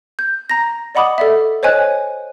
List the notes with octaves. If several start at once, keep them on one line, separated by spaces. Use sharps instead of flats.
G6
A#5 A#6
D5 D#5 F#5 B5 D6 D#6
A4 D5 E5
C5 C#5 D#5 G#5 F#6